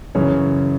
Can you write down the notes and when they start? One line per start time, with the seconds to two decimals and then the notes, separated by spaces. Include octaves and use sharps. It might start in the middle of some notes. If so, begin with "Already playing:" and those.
0.15 F#2 C#3 E3 C#5